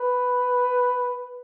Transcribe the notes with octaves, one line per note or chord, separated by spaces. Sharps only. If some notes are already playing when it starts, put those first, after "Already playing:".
Already playing: B4